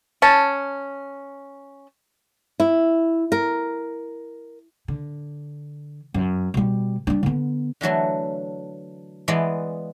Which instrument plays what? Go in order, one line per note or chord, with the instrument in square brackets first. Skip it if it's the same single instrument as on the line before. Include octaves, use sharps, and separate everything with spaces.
[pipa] C#4 A5
[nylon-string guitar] E4
A#4
[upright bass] D3
F#2
B2 G3
G3 D4
D3 B3
[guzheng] D3 E3 F#3 A3
E3 G#3 B3 D5